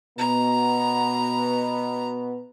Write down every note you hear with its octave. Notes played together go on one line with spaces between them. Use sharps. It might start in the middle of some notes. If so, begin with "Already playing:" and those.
B2 B3 A#5